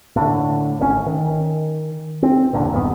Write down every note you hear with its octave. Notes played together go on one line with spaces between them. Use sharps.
A2 D3
G#1 C3 C#4
D#3
C4
F#1 E2 A#2 D3
E1 G2 D#3 B3